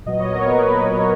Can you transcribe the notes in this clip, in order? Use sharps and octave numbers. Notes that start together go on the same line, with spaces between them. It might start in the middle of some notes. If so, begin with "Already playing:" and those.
A#2 F#3 B3 D#5
C#5
A#4
B4
C#5
B4